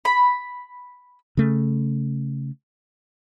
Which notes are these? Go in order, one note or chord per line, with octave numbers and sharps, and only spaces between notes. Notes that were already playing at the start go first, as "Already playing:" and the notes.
B5
C#3 A3